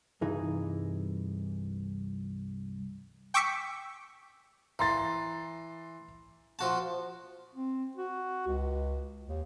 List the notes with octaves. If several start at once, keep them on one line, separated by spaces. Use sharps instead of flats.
C2 G2 E3 D#4 G#4
G5 C#6 D6 E6 B6 C#7
E3 A#5 C6 A6
F3 F#4 A5
C4
F#4
C#2
D#2